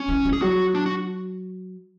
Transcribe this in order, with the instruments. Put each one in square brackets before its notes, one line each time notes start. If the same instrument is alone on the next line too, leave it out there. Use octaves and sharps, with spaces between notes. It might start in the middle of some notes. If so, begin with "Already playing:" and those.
Already playing: [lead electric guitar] C#4
[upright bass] E3
E3
[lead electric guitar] G#4
[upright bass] F#3 [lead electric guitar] F#4
[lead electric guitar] D4
F#4